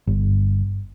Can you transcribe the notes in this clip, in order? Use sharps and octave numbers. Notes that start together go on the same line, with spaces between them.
G1